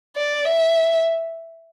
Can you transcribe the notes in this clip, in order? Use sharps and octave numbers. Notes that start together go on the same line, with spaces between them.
D5
E5